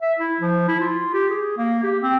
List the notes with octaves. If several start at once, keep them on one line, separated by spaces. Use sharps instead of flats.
E5
E4
F3
E4
F4
G4
G#4
A#3
G4
C4